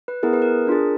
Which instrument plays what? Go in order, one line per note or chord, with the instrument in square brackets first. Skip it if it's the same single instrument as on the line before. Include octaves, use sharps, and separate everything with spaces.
[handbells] B4
B3 E4 G#4 A#4
B4
A#4
D4 F4 G#4